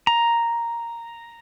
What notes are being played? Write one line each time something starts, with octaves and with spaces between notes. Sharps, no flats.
A#5